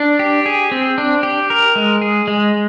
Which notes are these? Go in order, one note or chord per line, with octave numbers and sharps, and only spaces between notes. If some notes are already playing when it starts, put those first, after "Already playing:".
Already playing: D4
G4
G#4
C4
D4
G4
A#4
G#3
G#4
G#3